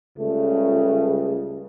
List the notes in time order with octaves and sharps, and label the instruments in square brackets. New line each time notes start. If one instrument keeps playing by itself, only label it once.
[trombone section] C#2 C#3 G3 A3